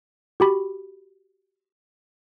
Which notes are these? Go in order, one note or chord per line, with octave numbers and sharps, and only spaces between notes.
F#4 G4 B5